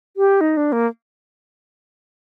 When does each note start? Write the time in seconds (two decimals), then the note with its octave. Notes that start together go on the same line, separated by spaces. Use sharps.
0.17 G4
0.41 D#4
0.57 D4
0.72 A#3